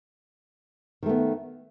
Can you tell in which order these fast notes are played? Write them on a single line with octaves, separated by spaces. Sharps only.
D#3 A3 B3